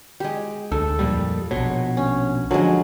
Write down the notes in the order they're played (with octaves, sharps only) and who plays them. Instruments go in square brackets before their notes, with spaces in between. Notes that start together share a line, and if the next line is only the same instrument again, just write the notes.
[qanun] G#3 G4
[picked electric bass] D2 [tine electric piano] A4
[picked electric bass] F2 A#2 G3
[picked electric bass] A#1 B2 [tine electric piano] C#5 F#5
[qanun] C#4
[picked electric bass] D3 [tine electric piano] F3 C#4 [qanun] F#3 G#3